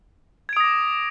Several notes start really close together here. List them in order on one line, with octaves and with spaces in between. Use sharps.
G#6 D7 D#6 A#6 D6